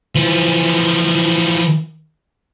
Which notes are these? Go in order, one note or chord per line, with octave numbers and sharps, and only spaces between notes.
E3 F3